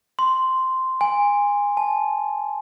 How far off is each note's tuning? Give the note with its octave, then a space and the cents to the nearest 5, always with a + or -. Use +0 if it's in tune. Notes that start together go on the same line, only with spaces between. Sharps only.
C6 -5
G#5 -20
A5 -30